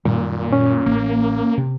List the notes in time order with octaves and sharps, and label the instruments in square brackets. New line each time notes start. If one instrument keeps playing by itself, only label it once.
[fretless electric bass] F#2 D#3 G3 [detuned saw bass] A#2
[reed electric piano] C#4
[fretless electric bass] A1 [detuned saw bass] A#3
[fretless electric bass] C3